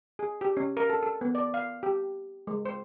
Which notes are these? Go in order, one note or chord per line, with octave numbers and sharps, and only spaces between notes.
G#4
G4
C#4
A#4
A4
A4
B3
D5
F5
G4
G#3
C5